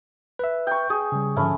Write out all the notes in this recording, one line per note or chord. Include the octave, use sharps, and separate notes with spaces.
B4 E5
G5 C#6
G#4
C#3 G3
G#2 D3 F3 A3 C#4 B5